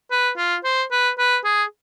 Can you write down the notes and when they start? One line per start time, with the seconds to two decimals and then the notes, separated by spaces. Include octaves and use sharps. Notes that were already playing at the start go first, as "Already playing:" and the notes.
0.11 B4
0.37 F4
0.64 C5
0.91 B4
1.19 B4
1.45 G#4